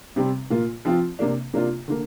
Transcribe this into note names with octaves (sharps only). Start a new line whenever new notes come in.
C3 G3 C4
A#2 A#3 F4
F3 C4 F4
C3 A#3 D4
C3 A#3 D4 F4
D3 A#3